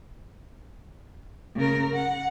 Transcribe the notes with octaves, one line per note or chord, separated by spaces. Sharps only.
C#3 A#4
F#5